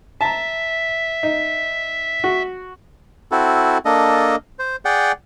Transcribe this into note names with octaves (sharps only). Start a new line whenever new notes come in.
E5 A5 A#5
D#4
F#4
C4 E4 F#4 A4
A#3 D4 A4 D#5
C5
G#4 D5 F#5 G5